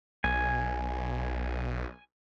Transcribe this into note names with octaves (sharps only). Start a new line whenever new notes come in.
B1 G#5